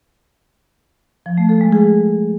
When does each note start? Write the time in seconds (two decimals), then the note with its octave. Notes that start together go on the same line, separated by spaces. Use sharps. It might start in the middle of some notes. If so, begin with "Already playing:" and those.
1.26 F3
1.38 A3
1.49 A4
1.61 G#3
1.72 G#4